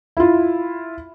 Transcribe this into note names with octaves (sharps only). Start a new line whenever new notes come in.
E4 F4